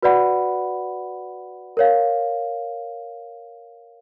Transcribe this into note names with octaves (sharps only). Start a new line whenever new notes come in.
F#4 B4 D5 F#5 B5
A#4 C#5 F5